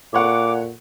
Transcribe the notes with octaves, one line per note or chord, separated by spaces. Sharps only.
A#2 A4 C#5 F#5 D6